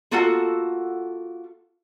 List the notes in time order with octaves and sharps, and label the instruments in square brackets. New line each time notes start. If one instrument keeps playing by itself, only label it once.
[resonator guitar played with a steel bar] A#3 F4 F#4 A4 F#5 A5